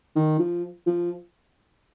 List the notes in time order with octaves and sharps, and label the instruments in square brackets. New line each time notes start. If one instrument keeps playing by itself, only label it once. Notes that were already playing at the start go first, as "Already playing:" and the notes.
[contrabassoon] D#3
F3
F3